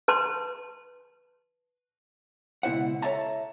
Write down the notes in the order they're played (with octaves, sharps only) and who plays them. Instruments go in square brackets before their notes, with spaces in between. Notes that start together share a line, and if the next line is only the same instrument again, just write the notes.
[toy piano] B4 A5 C6
[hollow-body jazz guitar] C#2 B2 E4 C5 F#5
A4 C#5 E5 A5 A#5